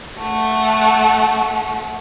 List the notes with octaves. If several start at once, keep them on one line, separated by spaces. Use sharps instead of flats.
A3 F#5